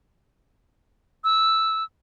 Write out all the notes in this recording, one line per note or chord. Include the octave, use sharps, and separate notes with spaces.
E6